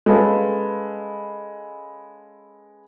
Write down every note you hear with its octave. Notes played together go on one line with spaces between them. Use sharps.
G#3 C#4 A4 B4 F5